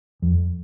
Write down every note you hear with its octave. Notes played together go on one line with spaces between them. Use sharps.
F2